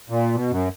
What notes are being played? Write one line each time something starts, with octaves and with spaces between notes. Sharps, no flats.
A#2
B2
F#2